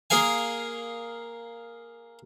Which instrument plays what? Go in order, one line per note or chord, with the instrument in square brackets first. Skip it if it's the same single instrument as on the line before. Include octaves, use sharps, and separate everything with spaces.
[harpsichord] A#3 G#4 A#4 F5 G#5